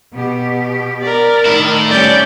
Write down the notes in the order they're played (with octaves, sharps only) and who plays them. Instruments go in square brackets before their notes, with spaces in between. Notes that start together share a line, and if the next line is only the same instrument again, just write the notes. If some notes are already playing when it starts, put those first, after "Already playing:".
[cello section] B2 G4
[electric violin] A#4 D5
[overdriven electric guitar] A2 E4 [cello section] D#3
[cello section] G3 C4 C#4 [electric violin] D5 G6